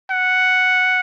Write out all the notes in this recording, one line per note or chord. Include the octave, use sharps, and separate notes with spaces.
F#5